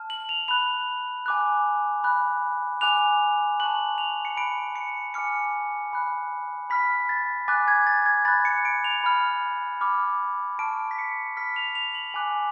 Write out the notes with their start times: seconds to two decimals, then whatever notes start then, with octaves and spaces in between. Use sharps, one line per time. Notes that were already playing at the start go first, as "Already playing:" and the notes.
Already playing: A5 F6
0.10 F#7
0.29 F7
0.48 B5 F#6 F7
1.26 G#5 D6 F#6
2.04 B5 F#6
2.81 G#5 D6 F#6 F7
3.60 A5 C#6 F#6 F#7
3.98 F7
4.25 C#7
4.37 B5 F#6 D7
4.75 C#7
5.14 G#5 D6 F6 C#7
5.93 B5 F#6
6.70 B5 F6 B6
7.09 A6
7.48 G#5 D6 F#6 A6
7.68 G#6
7.87 A6
8.06 G#6
8.25 B5 F#6 A6
8.45 C#7
8.65 D7
8.84 F7
9.04 B5 F6
9.81 B5 D6 F6
10.59 A5 C#6 F6 D7
10.91 B6
10.98 C#7
11.37 B5 F6 B6
11.56 F7
11.75 F7
11.95 F#7
12.14 G#5 D6 F#6